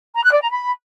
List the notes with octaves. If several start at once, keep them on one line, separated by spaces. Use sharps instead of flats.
A#5
F#6
D5
A#5
B5